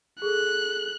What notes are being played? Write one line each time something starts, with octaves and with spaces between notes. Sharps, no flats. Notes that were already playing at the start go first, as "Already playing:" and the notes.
G#4 A4 F#6